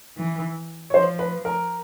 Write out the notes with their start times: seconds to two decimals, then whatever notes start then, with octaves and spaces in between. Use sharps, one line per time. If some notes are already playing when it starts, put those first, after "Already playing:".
0.17 E3
0.90 C#5
0.94 F3 C5
1.19 B4
1.45 A#4